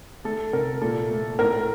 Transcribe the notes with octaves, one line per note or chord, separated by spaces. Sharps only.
A3 A4
C3 A#4
A#2 A4
A3
A2 A#4